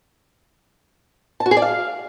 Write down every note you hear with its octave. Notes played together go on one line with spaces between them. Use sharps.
A5
F#4
G#4
D5
F5